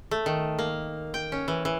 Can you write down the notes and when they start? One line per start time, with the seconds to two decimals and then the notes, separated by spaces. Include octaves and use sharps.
0.11 A3
0.26 D#3
0.59 A#3
1.14 G5
1.32 C#4
1.48 E3
1.65 E3